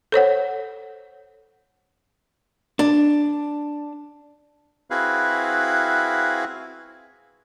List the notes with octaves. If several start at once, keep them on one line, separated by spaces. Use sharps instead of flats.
A4 C5 C#5 F#5
D4
C4 E4 F#4 G#4 B4 F5